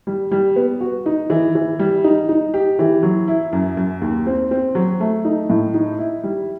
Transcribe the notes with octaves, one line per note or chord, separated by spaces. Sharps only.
G3
G3
B3
F#4
D#4
E3
E3
G3
D#4
D#4
G4
E3
F#3
E4
F#2
F#2
D#2
C4
C4
F#3
A3
D#4
A2
D#4
E4
G3